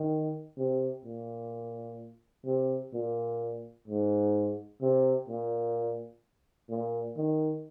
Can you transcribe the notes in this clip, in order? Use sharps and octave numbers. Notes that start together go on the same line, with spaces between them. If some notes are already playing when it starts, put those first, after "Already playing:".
Already playing: D#3
C3
A#2
C3
A#2
G#2
C3
A#2
A#2
D#3